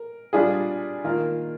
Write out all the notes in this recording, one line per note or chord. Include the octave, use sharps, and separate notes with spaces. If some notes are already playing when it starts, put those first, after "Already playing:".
Already playing: A#4
G3 D4 F4 G#4
D#3 A#3 F4 A#4